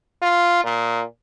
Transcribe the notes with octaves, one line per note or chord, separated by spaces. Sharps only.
F4
A#2